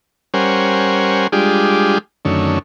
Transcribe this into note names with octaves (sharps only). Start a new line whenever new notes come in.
G3 C#4 A#4 C5 F#5 G#5
G3 G#3 D4 F4 G4 G#4
F#2 D3 D#3 A3 C#4